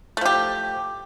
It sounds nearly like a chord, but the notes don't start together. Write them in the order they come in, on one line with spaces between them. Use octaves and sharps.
A3 F3 G4